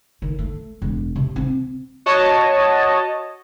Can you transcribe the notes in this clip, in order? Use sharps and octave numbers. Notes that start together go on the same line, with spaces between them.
D#3
A3
E1
C3
C4
F#4 C#5 D#5 A5